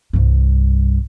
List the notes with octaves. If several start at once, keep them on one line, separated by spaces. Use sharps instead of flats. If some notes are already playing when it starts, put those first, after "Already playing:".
C2 G2